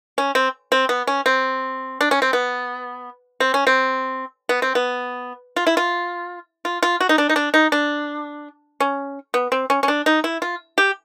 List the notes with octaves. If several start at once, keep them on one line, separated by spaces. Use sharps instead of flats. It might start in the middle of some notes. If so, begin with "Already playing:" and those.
C#4
C4
C4
B3
C#4
C4
D4
C#4
C4
B3
C4
C#4
C4
B3
C4
B3
F4
E4
F4
F4
F4
F#4
D#4
D4
D#4
D4
D#4
D4
C#4
B3
C4
C#4
C#4
D4
D#4
E4
F4
G4